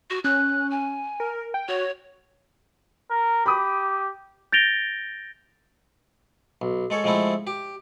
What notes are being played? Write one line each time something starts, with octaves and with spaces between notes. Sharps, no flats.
F#4
C#4 F#6
G#5
A#4
G5
F#4 C#5
A#4
G4 B5 D6 D#6
G6 A6 A#6 D7 F7 G7
B1
G#3 A4 C#5
F3 G#3 A3 C4 E4 A4
G4